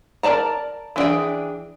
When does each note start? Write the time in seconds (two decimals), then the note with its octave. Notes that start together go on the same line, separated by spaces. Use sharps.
0.23 A#4 B4 D5 A5 A#5
0.96 E3 C4 D4 G#4 G5